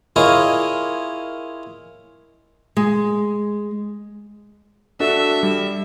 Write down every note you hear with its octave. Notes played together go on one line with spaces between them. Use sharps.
E4 F4 G#4 A#4 C#5 D#5
G#3
D4 F#4 A4 E5
G3